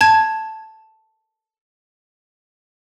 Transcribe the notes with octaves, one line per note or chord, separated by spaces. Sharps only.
A5 G#6